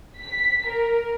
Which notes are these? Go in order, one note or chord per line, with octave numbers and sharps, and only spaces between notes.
B6
A#4